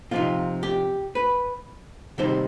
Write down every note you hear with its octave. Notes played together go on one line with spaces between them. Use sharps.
C3 F3 C4 D#4 F4
G4
B4
C3 D#3 G3 C4 D#4 C5